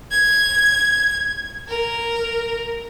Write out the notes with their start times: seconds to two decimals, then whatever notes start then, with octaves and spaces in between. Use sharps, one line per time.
0.12 G#6
1.69 A#4